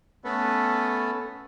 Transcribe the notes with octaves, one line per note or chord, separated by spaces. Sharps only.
A3 B3 C#4 A4 B4